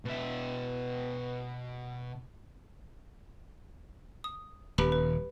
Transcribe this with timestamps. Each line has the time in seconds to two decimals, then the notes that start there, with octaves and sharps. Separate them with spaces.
0.05 B2 E5
4.24 D#6
4.78 D#1 G4 B4 B5
4.92 B4